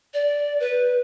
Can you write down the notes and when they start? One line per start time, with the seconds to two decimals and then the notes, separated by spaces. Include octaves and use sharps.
0.14 D5
0.60 B4